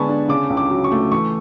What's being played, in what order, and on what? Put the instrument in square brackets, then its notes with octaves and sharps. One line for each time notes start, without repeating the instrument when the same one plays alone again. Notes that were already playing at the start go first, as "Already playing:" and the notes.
Already playing: [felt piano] D3 G#3 B3 [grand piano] G#5 A5 B5 C#6
[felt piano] D4
[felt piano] C#3 [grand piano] D6
[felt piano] C#2
[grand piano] D6
[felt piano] F#3
[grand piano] C#6
[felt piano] A3
[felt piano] E3 [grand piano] C#6